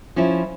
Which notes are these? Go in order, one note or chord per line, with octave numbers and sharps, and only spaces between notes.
F3 C#4 E4